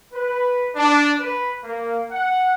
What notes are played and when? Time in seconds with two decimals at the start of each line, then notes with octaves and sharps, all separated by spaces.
0.13 B4
0.75 D4
1.20 B4
1.64 A#3
2.11 F#5